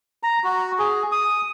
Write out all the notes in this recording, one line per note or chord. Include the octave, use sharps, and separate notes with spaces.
A#5
F#4
G#4
D#6